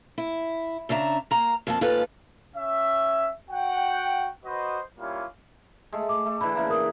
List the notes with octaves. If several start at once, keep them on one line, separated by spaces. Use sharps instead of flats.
E4
C#3 D4 E5 A#5
A#3 A#5
F2 A#3 A5
D#2 G#2 F4 A4 B4
C#4 E5
F#4 F#5 G5
F#4 B4 C5 D#5
G3 A#3 C#4 E4 F4
G#3 A3
D6
A3
D3 E3 B5
C#3 E3 A#3
A#4 D#6